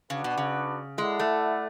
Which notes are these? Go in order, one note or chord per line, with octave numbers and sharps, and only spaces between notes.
C#3 D4 F#4 B4 D5 F#5
B2
C#3
G#3 E4 A4 D5 F#5
A3